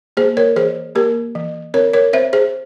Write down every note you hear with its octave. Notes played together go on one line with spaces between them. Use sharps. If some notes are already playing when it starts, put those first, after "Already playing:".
A#3 G#4 C5
A#4 C#5
E3 G#4 C5
A#3 G4 A#4
E3
C4 A#4 C#5
A#4 C#5
C4 C5 E5
G#4 C5